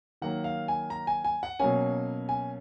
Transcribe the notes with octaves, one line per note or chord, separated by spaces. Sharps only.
D#3 F#3 A#3 F#5
F5
G#5
A#5
G#5
G#5
F#5
B2 F#3 A#3 C#4 G#5
G#5